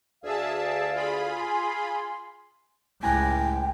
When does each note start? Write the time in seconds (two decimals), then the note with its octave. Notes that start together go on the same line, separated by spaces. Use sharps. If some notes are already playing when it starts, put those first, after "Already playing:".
0.23 D2 G#4 D5 E5 F5 A5
0.94 F4 G#4 B5
1.40 G#5 C6
3.03 C#2 A2 G5 G#5 A#5 F#6